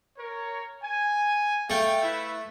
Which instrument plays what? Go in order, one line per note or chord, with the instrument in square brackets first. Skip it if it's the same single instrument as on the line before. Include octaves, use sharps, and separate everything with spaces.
[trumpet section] A#4 C#5
G#5
[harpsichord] A3 [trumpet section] F5 G5
[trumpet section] E4 B4 E5